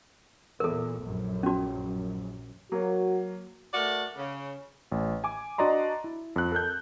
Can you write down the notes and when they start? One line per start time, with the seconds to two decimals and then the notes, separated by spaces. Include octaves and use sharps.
0.60 E2 A#2 A4 A#4
1.02 A#1 F#2
1.43 C#4 F#4
2.72 F#3 A#3 F#4
3.73 A3 F#4 A#4 D5
4.17 C#3
4.92 A1
5.24 G#5 D6
5.58 D4 F#4 D5 D#5 A#5 C6
6.04 E4
6.36 F2 F#6
6.52 A4 A#4 F#6 G6